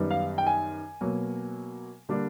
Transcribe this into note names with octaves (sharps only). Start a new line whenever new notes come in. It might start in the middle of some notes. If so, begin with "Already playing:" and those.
Already playing: F#2 D#3 G3 B3
F5
G5
G#5
B2 F#3 A#3
D3 G3 A#3 D4